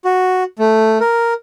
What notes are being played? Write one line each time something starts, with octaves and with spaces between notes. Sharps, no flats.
F#4
A3
A#4